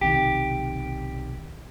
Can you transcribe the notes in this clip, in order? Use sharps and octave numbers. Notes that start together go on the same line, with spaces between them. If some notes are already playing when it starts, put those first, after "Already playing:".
B1 C3 D#3 G4